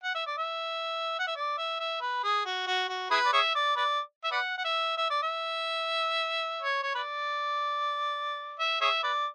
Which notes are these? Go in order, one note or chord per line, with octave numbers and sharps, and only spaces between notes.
F#5
E5
D5
E5
F#5
E5
D5
E5
E5
B4
G#4
F#4
F#4
F#4
E4 G#4 B4
D5
G#4 C#5 E5
D5
B4 D5
E5
B4 D5 F#5
F#5
E5
E5
D5
E5
C#5
C#5
B4 D5
E5
G#4 C#5 E5
B4 D5